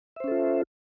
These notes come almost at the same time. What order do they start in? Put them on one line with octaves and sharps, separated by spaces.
E5 C5 C#4 A4 F4